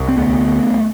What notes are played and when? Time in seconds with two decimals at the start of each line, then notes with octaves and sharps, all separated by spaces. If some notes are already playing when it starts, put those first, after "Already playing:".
Already playing: C2
0.08 C4
0.17 D2 A3 B3